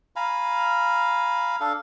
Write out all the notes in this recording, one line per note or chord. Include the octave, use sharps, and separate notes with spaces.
F5 G#5 A#5 B5
D4 A4 F5